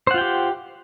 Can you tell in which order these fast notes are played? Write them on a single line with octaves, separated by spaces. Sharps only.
C5 F#5 F4 G5 G4